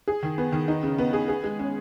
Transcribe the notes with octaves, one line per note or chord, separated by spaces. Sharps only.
G#4
D#3
B3
D#3
D#4
C#3
B3
G#4
G#4
G#3
C#4